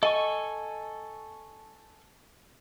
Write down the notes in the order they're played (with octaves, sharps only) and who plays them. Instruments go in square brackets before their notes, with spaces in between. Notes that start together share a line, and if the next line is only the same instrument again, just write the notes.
[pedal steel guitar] A4 G#5 C#6 [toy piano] D#5